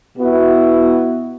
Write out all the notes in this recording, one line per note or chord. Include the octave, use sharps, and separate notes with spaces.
B2 B3 E4 F#4